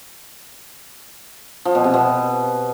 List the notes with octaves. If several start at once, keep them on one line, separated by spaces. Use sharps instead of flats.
F3
B2
C3
B2